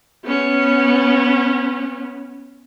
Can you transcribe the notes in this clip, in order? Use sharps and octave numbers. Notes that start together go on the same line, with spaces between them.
B3 C#4